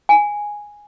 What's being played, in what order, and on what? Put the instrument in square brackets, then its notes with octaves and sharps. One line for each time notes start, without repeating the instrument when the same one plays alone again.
[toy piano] G#5